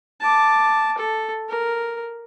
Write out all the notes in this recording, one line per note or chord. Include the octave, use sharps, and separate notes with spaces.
A5 D6
A4
A#4